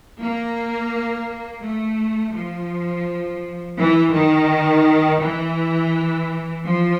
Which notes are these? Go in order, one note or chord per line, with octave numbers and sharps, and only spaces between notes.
A#3
A3
F3
E3
D#3
E3
F3